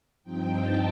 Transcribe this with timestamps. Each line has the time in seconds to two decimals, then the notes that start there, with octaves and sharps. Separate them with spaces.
0.23 G2 F3 C4 D#4 G5
0.53 A5